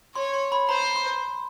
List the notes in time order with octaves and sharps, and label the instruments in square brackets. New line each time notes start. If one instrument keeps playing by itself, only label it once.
[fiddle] C#5 [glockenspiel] C6
[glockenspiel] C6
B5
[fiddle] C5 [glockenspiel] A#5
[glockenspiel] C6